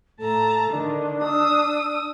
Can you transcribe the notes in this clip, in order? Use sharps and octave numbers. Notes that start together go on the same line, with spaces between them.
A2 A4 A5 A#5
D3 D#3 D4
D#6 E6